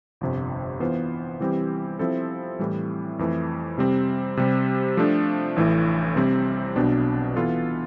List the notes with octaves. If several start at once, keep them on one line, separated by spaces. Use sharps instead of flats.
G1 F2 C3
E3 B3 F4 C5
E3 G3 C4 G4
F3 C4 E4 A4
A2 E3 G3
F2 E3 A3
C3 G3 C4
C3 G3 C4
F3 A3 D4 A4
A1 A2 E3 A3
C3 G3 C4
B1 B2 B3 D4
E3 B3 F4 A4